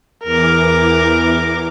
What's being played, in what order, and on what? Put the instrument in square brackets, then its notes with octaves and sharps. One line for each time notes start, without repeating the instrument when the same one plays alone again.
[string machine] E2 E3 D6 [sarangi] A#4